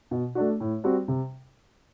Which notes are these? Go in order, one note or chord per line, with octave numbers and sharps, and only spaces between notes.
B2
A3 D4 F#4
A2
G3 C4 F#4
C3